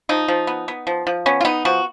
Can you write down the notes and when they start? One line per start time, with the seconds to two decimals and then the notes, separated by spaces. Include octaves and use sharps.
0.09 F3 D#4
0.28 F3
0.47 B3
0.68 B3
0.87 F3
1.07 F3
1.26 B3 C#4
1.41 F4
1.45 B3 D#4
1.65 F3 F#4